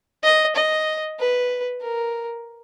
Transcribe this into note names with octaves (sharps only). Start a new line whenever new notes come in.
D#5
D#5
B4
A#4